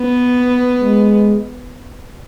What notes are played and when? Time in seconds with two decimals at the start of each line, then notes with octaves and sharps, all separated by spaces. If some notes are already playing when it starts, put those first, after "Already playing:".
Already playing: B3
0.81 G#3